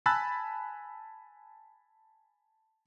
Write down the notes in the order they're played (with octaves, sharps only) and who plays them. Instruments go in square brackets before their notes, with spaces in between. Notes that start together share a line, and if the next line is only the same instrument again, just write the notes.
[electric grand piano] G#5 A5 B5 E6 F#6 A6